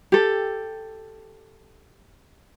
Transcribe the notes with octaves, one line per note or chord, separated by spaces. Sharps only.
G4 A4